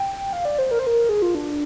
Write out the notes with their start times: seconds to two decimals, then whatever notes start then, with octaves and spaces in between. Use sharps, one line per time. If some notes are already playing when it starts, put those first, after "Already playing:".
Already playing: G5
0.33 F5
0.45 D5
0.59 C5
0.71 A#4
0.79 C5
0.87 A#4
1.09 G#4
1.22 F4
1.35 D4